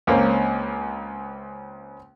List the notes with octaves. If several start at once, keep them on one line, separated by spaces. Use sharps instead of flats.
C#2 A#3 C4 C#4